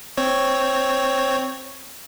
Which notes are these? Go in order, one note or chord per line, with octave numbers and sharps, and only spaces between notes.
C4 C#5